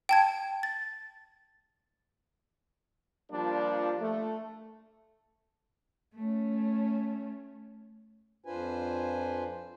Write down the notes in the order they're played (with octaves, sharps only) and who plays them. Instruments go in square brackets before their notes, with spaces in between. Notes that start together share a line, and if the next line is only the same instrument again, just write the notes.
[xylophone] G5 A5 G#6
A6
[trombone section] F3 G3 A#3 D4 F4
A3
[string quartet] A3 C#4
[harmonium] F2 D4 F4 B4 C5 G#5